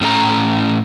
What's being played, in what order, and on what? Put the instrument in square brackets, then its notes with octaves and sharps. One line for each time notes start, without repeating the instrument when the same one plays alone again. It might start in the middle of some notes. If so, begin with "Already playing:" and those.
[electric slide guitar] A2 C#4 A4 C5 A#5